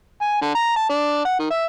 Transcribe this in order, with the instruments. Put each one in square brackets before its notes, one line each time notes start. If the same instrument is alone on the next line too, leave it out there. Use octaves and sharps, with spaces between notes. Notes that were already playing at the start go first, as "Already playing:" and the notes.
[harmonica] G#5
D3
A#5
A5
D4
F#5
D#3
E5